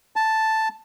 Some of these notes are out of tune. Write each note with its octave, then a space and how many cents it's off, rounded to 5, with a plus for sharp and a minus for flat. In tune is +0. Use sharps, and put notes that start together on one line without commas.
A5 +0